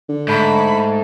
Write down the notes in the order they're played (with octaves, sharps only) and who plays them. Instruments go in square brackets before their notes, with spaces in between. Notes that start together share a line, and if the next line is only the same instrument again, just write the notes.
[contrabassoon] D3
[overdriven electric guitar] G#2 [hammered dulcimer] A3 [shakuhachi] B5